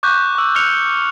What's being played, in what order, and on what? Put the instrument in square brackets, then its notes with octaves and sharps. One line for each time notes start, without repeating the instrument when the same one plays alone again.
[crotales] C#6 D6 F#6 G6
C#6 E6
F6 F#6 C#7 F7